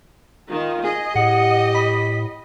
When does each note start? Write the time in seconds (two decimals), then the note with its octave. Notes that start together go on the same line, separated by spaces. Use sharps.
0.50 D#3 F4
0.84 G#4 D#5
1.15 A2 G4 F#5
1.75 B5